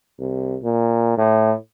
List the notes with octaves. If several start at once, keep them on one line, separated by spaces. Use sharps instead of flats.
C2
A#2
A2